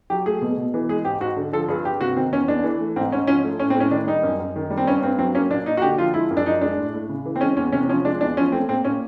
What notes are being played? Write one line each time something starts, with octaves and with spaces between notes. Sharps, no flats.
F#3 G4
A3 G#4
B2
B2
E3
G#3 G#4
G#2 G4
G#2 F#4
D3
F3 A4
G2 G#4
G2 G4
C3 F#4
D#3 C4
E2 C#4
E2 D4
E3
A3
G#2 C4
G#2 C#4
F3 C#4
A3
A2 C#4
C4
A2
C#4
D#3 D4
G3 D#4
F#2
F#2
D#3
G3
C4
G2 C#4
G2 C4
F#3 C4
A#3 C#4
A#2 D4
A#2 D#4
F#4
D3 G4
F3 F4
G#3 E4
F#2
D4
F3 D#4
G#3 D4
A2
A2
C#3
E3
C4
G#3 C#4
E2 C#4
C3 C#4
F3 C#4
G#3 D4
E2 D4
F3 C#4
A3 C4
A#2 C4
A#2 C#4